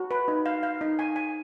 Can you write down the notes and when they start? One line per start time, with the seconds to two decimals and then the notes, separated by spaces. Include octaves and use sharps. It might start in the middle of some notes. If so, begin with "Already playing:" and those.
Already playing: F#4
0.11 B4
0.28 D#4
0.46 F5
0.63 F5
0.81 D#4
0.99 G#5
1.16 G#5